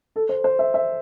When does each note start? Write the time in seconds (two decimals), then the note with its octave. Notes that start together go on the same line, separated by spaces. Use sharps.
0.16 A4
0.29 C5
0.44 C5
0.59 E5
0.74 E5